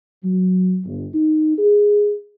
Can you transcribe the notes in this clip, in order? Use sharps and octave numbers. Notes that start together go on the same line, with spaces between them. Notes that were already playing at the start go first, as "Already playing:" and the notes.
F#3
G1
D#4
G#4